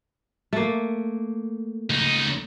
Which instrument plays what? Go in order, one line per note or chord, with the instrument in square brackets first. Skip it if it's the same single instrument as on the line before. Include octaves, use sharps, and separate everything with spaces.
[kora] A3 A#3
[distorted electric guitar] C#2 D#4